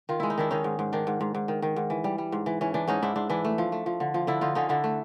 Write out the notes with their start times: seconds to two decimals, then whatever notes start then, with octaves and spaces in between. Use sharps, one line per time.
0.09 D#3 F4
0.20 G#3 E4
0.30 D#4
0.38 D#3 D4 E4
0.50 D#3 C#4 D#4
0.64 G#2
0.79 G#2
0.93 D#3 D4
1.07 G#2
1.21 G#2
1.35 G#2
1.48 D#3
1.62 D#3
1.76 G#2
1.90 E3
2.04 G3
2.18 G3
2.32 G#2
2.46 E3
2.61 E3 C#4
2.74 E3 D4
2.88 G#2 C#4 D#4
3.02 G#2 D4 E4
3.16 G#2 D4
3.30 E3 D4 E4
3.45 A3
3.58 F3
3.72 A3
3.86 F3
4.00 D3
4.14 F3
4.27 D3 D4 E4
4.41 D3 D#4 F4
4.55 D3 C#4 D#4
4.69 D3 D4 E4
4.84 A3